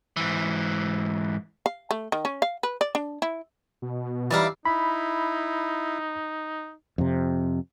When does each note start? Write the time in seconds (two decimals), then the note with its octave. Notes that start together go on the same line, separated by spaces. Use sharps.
0.17 G#2 E3
1.66 F5
1.91 A3
2.12 D#3
2.25 C#4
2.42 F5
2.63 B4
2.81 D5
2.95 D4
3.22 E4
3.82 B2
4.31 E3 G3 D#4 D5 E5 F5
4.65 D#4 E4 B5
6.98 F2 C3